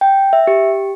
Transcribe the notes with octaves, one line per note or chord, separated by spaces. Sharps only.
G5
E5
G4